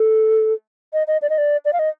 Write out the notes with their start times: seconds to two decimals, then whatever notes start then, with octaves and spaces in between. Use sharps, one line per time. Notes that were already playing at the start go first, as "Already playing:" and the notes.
Already playing: A4
0.93 D#5
1.07 D#5
1.22 D5
1.30 D#5
1.38 D5
1.65 D5
1.73 F5
1.79 D#5